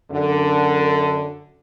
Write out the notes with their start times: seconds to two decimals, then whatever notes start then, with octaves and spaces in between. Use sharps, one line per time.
0.12 F#2 D3